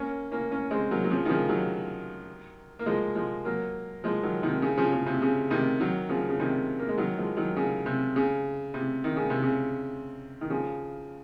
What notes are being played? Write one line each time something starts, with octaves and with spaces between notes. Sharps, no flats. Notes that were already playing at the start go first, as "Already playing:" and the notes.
Already playing: A#3 C#4
A#3 C#4
A#3 C#4
G#3 C4
F#3 A#3
F#3
C#3 F3
D#3
C#3 F3
D#3 F#3
A#3
F3 G#3
F3 G#3
F#3 A#3
F3 G#3
D#3 F#3
C3 D#3
C#3
C#3 F3
C#3
C3
C#3
C3 D#3
D#3 F#3
C#3 F3
C#3
C3 D#3
A#3
G#3
D#3 F#3
F3 G#3
D#3 F#3
C#3
C3
C#3
C3
D#3
C#3
C3
C#3
D#3
C#3 F3